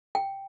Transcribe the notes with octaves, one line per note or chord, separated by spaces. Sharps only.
G5